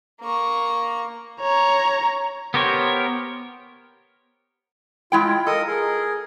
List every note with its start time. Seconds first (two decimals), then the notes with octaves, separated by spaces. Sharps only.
0.21 A#3 C#6
1.40 C#5 A#5
2.54 B3 G4 A#4 C5 C#5
5.12 G#3 E4 F4 G5
5.47 A4 A#4 D#5 D#6
5.67 G#4 A#4